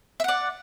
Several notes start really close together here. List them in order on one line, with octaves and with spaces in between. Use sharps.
E5 F#5 D5